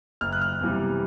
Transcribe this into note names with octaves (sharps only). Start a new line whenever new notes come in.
F#1 F6
F#6
F6
E2 C3 E3 G3